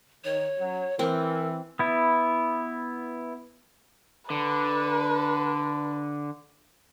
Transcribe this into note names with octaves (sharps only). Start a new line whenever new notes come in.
D#3 C#5
F#2 F#3
E3 C4 A#4
B3 E4
D3 B4